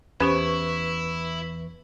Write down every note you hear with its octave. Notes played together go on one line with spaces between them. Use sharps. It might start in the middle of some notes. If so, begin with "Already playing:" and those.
E2 C#4 E4 G4 B4 C5 C#6